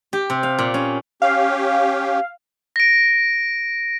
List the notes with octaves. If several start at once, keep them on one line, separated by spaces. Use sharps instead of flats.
G4
C3
F5
A#2
C#4
C#4 G4 F5
A#6 D7